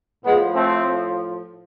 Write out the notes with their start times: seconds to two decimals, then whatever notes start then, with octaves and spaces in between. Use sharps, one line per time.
0.24 A2 F3 G#3 B3
0.55 A3 C4